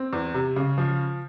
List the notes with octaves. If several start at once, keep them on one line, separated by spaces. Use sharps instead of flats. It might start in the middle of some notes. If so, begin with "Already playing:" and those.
Already playing: C4
E2
C3
C#3
F3